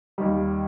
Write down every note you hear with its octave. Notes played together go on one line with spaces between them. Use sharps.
D#2 D#3 G3